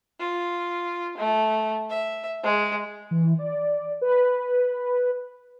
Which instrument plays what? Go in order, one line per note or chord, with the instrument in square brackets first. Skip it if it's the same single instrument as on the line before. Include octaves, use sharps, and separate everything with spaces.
[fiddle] F4
A3
E5
G#3
[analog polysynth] E3
D5
B4